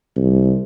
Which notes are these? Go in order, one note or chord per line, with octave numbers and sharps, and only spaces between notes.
C2